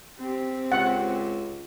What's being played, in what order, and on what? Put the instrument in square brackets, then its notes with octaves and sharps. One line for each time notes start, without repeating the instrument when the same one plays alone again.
[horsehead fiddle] C4 G4
[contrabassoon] C#2 [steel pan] F#5